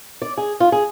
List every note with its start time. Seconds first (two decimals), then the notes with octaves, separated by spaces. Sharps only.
0.22 D5
0.38 G#4
0.60 F4
0.72 G#4